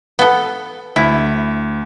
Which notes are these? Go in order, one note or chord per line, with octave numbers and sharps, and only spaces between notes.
B3 A4
D2 E4